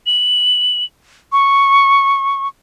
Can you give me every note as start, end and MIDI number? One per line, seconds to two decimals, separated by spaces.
0.06 0.84 102
1.32 2.48 85